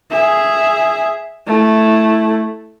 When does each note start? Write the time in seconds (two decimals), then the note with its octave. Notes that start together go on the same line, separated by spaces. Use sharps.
0.11 G#4 E5
1.47 A3 E4